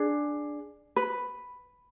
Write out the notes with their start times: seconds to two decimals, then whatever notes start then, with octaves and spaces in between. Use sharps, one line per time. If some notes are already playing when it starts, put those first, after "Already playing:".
Already playing: D4 G#4
0.96 B4